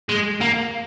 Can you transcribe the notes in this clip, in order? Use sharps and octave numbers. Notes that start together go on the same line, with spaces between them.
G#3
A#3